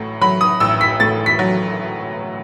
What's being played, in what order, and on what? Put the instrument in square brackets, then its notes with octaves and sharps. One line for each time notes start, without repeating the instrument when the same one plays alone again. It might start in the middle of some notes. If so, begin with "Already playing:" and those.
Already playing: [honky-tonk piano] A1 A2 F#3
F#3 B5
D#6
A1 E6
B6
A2 A6
B6
F#3